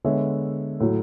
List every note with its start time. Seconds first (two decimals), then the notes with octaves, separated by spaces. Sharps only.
0.04 D3 G#3 B3 C#5 E5
0.80 A2 F#3 A3